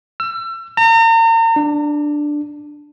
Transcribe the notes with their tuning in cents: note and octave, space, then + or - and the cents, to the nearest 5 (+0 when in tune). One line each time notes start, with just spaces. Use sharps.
E6 +35
A#5 -40
D4 +5